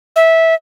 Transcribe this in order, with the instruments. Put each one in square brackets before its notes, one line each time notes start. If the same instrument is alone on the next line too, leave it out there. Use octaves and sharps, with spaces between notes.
[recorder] E5